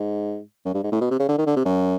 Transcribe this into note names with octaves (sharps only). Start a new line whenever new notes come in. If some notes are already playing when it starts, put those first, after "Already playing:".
Already playing: G#2
F#2
G2
G#2
A2
B2
C3
C#3
D3
D#3
D3
C3
F#2